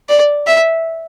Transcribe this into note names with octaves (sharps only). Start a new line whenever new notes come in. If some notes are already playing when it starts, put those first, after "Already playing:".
D5
E5